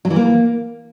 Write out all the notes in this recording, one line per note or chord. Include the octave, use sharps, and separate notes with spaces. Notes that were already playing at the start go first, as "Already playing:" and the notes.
F#3
E3
A#3